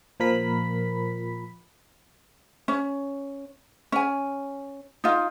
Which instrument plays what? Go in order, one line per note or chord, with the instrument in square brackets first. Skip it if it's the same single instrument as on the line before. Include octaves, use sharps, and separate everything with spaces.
[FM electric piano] A#2 F3 A#4 B5 B6
[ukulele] C#4
C#4 G#5
D#4 F4